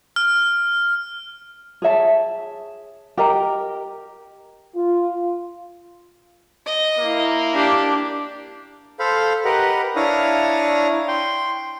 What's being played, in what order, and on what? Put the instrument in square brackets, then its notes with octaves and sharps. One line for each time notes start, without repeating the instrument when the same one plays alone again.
[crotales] F6
[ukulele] G#4 C#5 E5 A5
G4 A#4 D#5 A#5
[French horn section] F4
[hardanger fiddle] D#5
[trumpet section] A#3 [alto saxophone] E4
[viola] D4 [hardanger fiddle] G4
[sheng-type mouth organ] A4 C5 F5 B5
G4 A#4 B4 D#5 F#5
D4 E4 C#5 F5 A#5 D#6
G5 C6